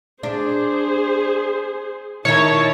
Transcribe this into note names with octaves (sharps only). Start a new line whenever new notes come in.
D4 G#4 C5
D#3 D#4 E4 C#5 A5